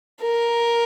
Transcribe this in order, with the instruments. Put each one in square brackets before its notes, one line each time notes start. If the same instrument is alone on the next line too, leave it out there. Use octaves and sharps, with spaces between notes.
[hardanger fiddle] A#4